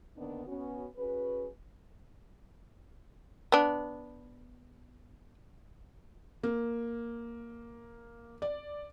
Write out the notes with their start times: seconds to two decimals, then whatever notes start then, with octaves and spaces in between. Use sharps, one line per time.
0.17 D3 D#3 A#3 B3 D4 D#4
0.47 B3 C#4 F#4
0.96 C#4 F#4 G#4 B4
3.52 B3 D4
6.43 A#3
8.42 D5